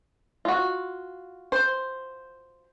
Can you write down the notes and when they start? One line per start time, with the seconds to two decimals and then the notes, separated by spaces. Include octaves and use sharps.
0.45 F4 F#4
1.52 C5